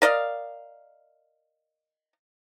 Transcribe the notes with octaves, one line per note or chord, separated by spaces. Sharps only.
A#4 D5 D#5 F5